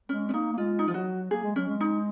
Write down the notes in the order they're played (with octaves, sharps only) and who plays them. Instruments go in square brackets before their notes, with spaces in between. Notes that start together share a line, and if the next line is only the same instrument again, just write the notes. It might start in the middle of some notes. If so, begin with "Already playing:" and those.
[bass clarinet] G#3 [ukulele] C#4
[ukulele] C#4
[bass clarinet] A#3 [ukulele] D#4
[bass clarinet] A#3
[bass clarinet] G#3 [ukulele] F4
[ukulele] D#4
[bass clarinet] F3 [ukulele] F4
[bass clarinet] F#3 [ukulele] F#4
[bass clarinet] A#3 [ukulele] G#4
[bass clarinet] G#3
[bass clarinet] F#3 [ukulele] C#4
[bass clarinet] G#3
[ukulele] D#4